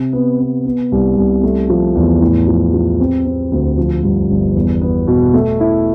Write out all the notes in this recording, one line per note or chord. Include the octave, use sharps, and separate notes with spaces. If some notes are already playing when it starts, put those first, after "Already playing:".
Already playing: C3
B3
B3
B3
C2
C2
A3
F3
E2
A2
F3
F3
C4
C4
D2
F3
G2
G1
E2
B3
B2
A3
E4